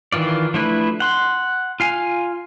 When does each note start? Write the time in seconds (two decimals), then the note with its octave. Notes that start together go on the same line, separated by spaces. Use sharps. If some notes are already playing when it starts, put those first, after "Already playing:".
0.12 D#3 E3 F4 D5
0.54 F3 A3 D4 E4 B4
1.00 F#5 C6
1.80 F4 F5 G#5